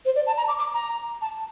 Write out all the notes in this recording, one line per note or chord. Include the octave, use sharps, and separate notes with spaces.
C5
D5
A5
A#5
D6
D6
A#5
A5